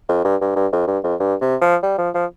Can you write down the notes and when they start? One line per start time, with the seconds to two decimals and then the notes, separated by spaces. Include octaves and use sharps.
0.09 F2
0.24 G2
0.41 G2
0.56 G2
0.72 F2
0.87 G2
1.04 F2
1.20 G2
1.41 C3
1.61 F3
1.82 G3
1.98 F3
2.14 F3